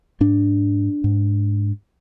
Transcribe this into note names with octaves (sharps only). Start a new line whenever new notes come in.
G#2 D4
G#2